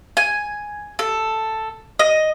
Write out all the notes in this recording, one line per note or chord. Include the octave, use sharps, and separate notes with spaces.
G#5
A4
D#5